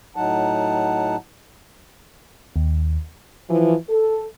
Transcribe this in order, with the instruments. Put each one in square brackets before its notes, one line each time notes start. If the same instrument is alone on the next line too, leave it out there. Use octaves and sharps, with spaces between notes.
[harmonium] A2 F#3 D#4 F#5 A5
[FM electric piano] D#2
[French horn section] E3 F3
A4